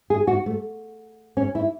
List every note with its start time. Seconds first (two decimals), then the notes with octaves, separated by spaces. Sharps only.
0.10 G#4
0.27 F#4
0.46 A3
1.37 C#4
1.55 E4